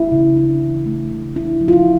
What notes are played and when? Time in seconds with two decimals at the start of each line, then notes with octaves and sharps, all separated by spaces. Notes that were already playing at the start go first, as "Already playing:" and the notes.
Already playing: A3 E4
0.12 C#3
0.36 D4
0.62 E3
0.86 A3
1.11 C#3
1.36 D4 E4
1.61 F3
1.68 F4
1.73 E4